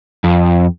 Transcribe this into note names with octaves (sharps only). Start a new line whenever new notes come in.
F2